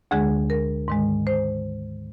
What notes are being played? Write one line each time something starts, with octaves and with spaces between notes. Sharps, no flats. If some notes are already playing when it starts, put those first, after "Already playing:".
D2 D3 G#3 G#4
A#4
G#2 D#3 G#3
C5